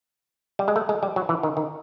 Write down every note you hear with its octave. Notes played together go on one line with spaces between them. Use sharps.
G3
G#3
A3
G#3
G3
F#3
E3
D#3
D#3